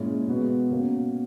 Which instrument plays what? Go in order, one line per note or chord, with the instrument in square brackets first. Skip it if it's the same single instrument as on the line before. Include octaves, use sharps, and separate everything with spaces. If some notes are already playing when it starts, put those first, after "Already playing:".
Already playing: [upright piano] A#2 G#3 C#4 E4
B2 G#3 B3 F#4
B2 A#3 C#4 F#4